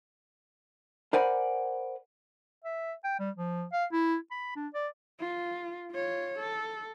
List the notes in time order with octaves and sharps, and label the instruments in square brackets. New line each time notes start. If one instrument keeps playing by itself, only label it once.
[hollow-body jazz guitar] A#4 C5 D5 F#5 G#5 B5
[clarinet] E5
G5
G3
F3
F5
E4
B5
D4
D5
[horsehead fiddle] F4
F4 C#5
A4